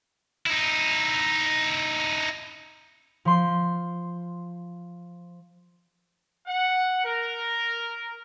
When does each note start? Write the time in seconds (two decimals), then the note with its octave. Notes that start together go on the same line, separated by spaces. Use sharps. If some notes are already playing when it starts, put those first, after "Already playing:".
0.46 D#4 E4
3.25 F3 C6
6.47 F#5
7.05 A#4